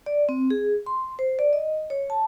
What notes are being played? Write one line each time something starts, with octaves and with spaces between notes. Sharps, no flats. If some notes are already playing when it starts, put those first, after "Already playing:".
D5
C4
G#4
C6
C5
D5
D#5
C#5
A5